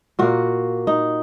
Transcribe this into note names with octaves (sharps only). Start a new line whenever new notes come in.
A#2 A#3 F#4
D#4